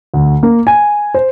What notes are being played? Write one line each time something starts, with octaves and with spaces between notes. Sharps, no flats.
D2
A#3
G#5
C5